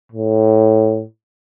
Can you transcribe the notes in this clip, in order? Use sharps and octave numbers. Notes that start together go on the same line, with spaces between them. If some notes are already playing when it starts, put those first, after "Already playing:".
A2